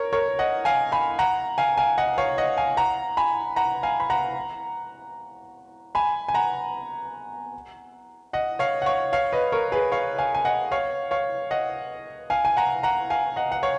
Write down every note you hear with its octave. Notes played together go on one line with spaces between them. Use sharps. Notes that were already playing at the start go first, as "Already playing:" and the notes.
Already playing: A#4 C#5
A#4 C#5
D#5 F#5
F5 G#5
G#5 B5
F#5 A#5
F5 G#5
F5 G#5
D#5 F#5
C#5 F5
D#5 F#5
F5 G#5
F#5 A#5
G#5 B5
F#5 A#5
F5 G#5
B5
F#5 A#5
G#5 B5
G#5
F#5 A#5
D#5 F#5
C#5 F5
F#5
C#5 F5
C#5 F5
B4 D#5
A#4 C#5
G#4 B4
C#5 F5
F5 G#5
G#5
D#5 F#5
C#5 F5
C#5 F5
D#5 F#5
F5 G#5
G#5
F#5 A#5
F#5 A#5
F5 G#5
D#5 F#5
F#5
C#5 F5